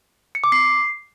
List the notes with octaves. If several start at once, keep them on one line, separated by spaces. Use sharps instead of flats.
C#7
D6
C7